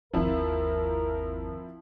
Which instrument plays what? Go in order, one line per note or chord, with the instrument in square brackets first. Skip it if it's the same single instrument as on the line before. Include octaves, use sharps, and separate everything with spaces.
[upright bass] G1 D#2 [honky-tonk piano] F3 C4 E4 [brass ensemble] A#4